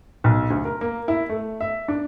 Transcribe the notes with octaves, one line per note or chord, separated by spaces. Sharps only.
B1
D2
A#4
A#3
E4
A3
E5
D4